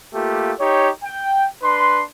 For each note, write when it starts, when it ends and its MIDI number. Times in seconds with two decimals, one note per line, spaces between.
0.13 0.52 57
0.13 0.52 58
0.13 0.52 65
0.13 0.52 67
0.58 0.89 63
0.58 0.89 67
0.58 0.89 73
1.02 1.45 79
1.62 2.01 62
1.62 2.01 71
1.62 2.01 84